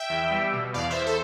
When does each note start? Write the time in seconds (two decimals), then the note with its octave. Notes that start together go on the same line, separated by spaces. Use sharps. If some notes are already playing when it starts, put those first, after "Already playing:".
Already playing: E5 G5
0.10 E2
0.31 G3
0.53 B2
0.74 E2 D5 F5
0.90 C5 E5
0.95 E2
1.06 A4 C5